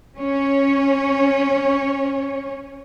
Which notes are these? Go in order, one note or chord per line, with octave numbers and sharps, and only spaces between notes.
C#4 C#5